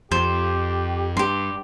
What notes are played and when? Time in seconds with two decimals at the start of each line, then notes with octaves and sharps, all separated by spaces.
0.12 F2 G4 C5
1.17 G2 G4 C6